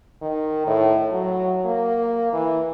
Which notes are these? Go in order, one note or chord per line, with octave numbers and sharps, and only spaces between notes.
D#3
A2
F#3
A#3
E3